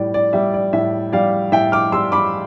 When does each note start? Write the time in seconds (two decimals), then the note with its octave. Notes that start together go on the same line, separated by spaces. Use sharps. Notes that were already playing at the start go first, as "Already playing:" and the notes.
Already playing: A2 G3 D5
0.14 D5
0.33 G3 E5
0.54 D5
0.73 A2 E5
1.13 G3 D5 F5
1.52 A2 E5 G5
1.72 D6 F6
1.92 G3 C6 E6
2.12 B5 D6